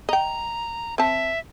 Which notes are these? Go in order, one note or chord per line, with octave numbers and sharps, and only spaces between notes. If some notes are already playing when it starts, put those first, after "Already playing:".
D#5 G5 A#5
C4 E5 A5